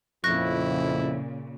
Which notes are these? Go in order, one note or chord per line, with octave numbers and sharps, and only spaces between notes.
F2 A#2 C#3 E4 C#6 F#6 A#6